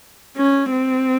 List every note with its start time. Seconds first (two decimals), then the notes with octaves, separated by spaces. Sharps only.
0.37 C#4
0.71 C4